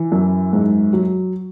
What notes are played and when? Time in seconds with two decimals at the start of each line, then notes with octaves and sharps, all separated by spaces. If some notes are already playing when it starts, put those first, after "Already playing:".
Already playing: E3
0.12 F#2
0.53 G#2
0.93 F#3